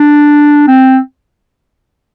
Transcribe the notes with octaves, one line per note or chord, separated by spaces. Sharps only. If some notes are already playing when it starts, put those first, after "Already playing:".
Already playing: D4
C4